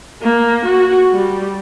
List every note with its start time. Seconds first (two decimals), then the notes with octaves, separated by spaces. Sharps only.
0.22 A#3
0.65 F#4
1.12 G3